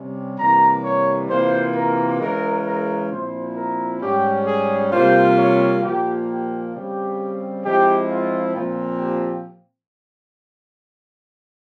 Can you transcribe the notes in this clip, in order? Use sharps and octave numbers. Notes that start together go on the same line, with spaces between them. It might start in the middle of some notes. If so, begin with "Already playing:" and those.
Already playing: C3 G3 C#4
C3 E3 G3 A#3 A#5
C#5
C3 E3 A#3 F4 C5
A#4
C#3 E3 G#3 A#4
A#4
A#2 F3 C4 E4 C5
A#4
G#2 G3 C#4 G4
G#4
C3 G3 A#3 F4 C5
C#5
A#2 F3 A#3 G4
G4
C#3 G3 C4 G4
F3 G#3 C4 E4 G4
F4
A#2 F3 C4
G4